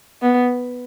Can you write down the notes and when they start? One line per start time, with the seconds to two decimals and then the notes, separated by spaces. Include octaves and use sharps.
0.22 B3